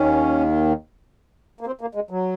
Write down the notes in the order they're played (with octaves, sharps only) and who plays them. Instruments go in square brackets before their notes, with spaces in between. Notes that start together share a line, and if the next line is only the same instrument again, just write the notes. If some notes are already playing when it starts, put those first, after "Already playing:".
Already playing: [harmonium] D#2 D#3 C#4
A#3
C4
A#3
G#3
F#3